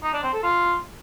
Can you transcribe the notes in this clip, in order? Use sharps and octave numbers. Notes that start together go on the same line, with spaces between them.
D#4
D4
C4
A4
F4